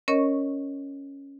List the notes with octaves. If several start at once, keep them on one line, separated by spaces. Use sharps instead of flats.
C#4 A#4 C#5 D#5 C#6